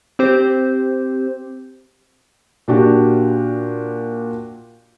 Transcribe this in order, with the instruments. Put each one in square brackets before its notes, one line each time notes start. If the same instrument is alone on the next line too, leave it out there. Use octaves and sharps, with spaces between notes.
[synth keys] C4 G4 C5
[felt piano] A#2 D4 F#4 G4